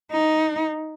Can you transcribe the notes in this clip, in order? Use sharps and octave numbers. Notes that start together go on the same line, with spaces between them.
D#4